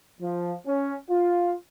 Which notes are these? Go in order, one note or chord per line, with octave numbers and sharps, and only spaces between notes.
F3
C#4
F4